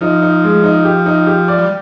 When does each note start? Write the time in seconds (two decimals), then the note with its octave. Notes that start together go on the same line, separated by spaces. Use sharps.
0.01 F3 D#4
0.22 D#4
0.44 G#3
0.64 D#4
0.85 G4
1.06 D#4
1.27 G4
1.48 D5
1.58 G3